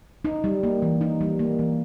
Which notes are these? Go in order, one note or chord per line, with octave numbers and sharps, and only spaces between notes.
D#4
G3
A#3
E3
D#4
G3
A#3
E3